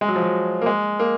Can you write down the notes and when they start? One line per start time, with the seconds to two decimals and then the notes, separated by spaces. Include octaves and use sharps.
0.01 G#3
0.08 F#3
0.16 F3
0.23 F#3
0.61 A#3
0.66 G#3
0.99 A#3